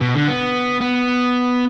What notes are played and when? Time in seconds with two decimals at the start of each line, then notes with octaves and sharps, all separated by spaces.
0.01 B2
0.15 D3
0.28 B3
0.81 B3